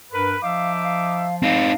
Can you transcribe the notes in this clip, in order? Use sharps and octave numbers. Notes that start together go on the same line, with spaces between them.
G2 A#4 B4
F3 D#4 E5 F5 D6
F5
C4 D#4 F5